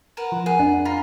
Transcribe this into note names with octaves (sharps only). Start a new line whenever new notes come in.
A#4 B4 F#5 E7
F3
G#4 A#4 F#5
F2 D4 F#5
F4 F5 A#5 B5